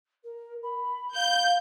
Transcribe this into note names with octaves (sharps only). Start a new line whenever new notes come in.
A#4
B5
F5 G6